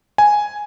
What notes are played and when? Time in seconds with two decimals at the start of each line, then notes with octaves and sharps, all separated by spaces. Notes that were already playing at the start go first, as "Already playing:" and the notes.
0.18 G#5